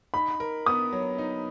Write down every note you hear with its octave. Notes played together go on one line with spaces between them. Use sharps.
D#4 B5
A#4
B3 D#6
F#3
D#4